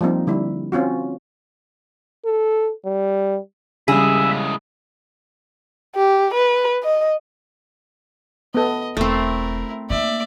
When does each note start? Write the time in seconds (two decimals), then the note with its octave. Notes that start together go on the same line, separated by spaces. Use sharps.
0.01 F3 G3 A#3 C4 D#4
0.27 D3 G3 E4
0.72 C4 C#4 F4 F#4
2.26 A4
2.86 G3
3.88 C#3 G3 G#3 E4 G#4 E5
5.96 G4
6.35 B4
6.83 D#5
8.54 B3 A4 D#5
8.97 E1 A3 C4 E4 A#4
9.90 A#3 D#4 D5 E5